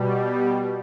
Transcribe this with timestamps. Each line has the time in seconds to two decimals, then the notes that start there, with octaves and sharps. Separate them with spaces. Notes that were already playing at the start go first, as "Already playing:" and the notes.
Already playing: B2 G3